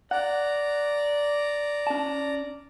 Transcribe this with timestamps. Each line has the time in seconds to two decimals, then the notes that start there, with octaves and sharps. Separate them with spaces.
0.11 D5 F#5 A#5
1.87 C#4 A5